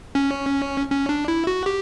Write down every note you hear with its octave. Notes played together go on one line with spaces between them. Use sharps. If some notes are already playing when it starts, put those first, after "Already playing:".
C#4
C#4
D4
E4
F#4
G4